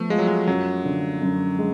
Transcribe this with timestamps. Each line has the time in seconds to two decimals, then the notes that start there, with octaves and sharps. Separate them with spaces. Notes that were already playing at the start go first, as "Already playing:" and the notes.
Already playing: F3 A3 B3
0.10 G#3 F4
0.19 F#3
0.27 G#3
0.47 F#2 F#3
0.85 D3
1.22 F#2
1.59 G#3